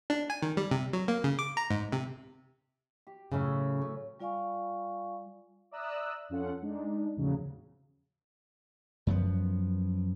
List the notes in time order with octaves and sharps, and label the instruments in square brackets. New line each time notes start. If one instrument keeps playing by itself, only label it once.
[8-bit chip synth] D4
G#5
D#3
G3
C3
F#3
A#3
C#3
D6
A#5
G#2
C3
[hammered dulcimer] G4
[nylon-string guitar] A2 C#3 [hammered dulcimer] F#3 C#4 E5
[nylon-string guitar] A3
[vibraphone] G3 F4 D5 F5 G#5 C#6
[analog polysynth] D5 E5 A#5 D#6 E6 F#6
F2 C#4 F4 A4 F#5
G#3 D4 D#4
E2 A2 C#3 F3 F#3
[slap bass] F#2 F3 B3